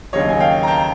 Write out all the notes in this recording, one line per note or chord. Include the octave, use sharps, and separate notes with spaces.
D#2 C#3 F#3 C#5 D#5
G#5
F5 G5
A#5
G5 A5